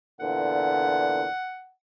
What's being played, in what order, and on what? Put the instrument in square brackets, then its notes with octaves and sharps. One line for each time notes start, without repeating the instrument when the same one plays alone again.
[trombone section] E2 A#2 D3 [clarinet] F#5